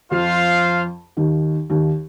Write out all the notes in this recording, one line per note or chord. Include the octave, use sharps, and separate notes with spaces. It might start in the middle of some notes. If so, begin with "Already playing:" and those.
F2 F3 F4 C5 F5
D#2 D#3
D#2 D#3